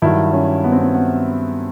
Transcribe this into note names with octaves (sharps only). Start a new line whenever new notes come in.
G2 D#3 F#3 E4
C#4
B3
C4
B3
B3